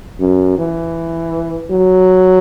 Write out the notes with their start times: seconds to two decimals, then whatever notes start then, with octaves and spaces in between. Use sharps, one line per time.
0.20 F#2
0.58 E3
1.70 F#3